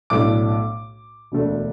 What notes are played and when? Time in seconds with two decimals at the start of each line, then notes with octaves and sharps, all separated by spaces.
0.10 B1 A2 A3 D4 D6
1.32 E1 D2 D3 A3 D4